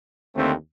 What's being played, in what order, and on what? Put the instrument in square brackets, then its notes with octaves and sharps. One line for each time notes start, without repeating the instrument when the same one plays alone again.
[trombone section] D#2 D3 A3 C4